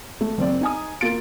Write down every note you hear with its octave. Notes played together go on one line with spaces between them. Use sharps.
A3
F#1 C4 D5
D#4 G#5 D#6
A#3 F4 A6 D7